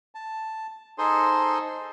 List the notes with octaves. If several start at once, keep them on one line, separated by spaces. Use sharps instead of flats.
A5
D#4 G#4 A4 C5 C6